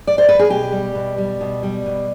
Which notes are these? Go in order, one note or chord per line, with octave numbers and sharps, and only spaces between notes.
D5
C5
B4
G#4
B2 G4
G3
B2
G3
B2
G3
B2